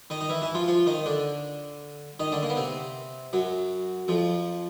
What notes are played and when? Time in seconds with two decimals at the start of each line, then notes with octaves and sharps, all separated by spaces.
0.10 D#3 D#4
0.21 D#4
0.29 E3 E4
0.42 E3 E4
0.54 F3 F4
0.68 F3 F4
0.86 D#3 D#4
1.06 D3 D4
2.20 D#3 D#4
2.32 D3 D4
2.43 A#3
2.49 B3
2.57 C3 C4
3.33 F#2 F#3
4.08 F2 F3